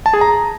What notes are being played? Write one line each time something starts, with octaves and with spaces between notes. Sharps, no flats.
A5
G#4
A#5